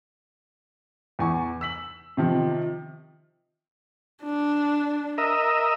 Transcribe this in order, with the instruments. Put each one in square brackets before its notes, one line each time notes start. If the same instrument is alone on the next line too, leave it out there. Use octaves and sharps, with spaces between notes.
[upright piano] E2 G#5 C#6
E6 B6 F#7
C3 D#3 F3 C4
[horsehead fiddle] D4
[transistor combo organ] A#4 D#5 E5